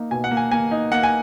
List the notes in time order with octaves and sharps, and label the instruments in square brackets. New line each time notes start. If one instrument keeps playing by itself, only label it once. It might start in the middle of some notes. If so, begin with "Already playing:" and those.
Already playing: [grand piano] A#3 D#4
B2 G#5
F#5
A#3
G#5
A#3 G#5
D#4
A#3 F#5
G#5